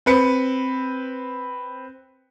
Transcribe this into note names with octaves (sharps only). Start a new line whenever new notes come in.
C4 B4 C#7